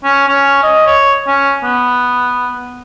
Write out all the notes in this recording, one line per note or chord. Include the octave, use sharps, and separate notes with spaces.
C#4
C#4
D#5
C#5
C#4
B3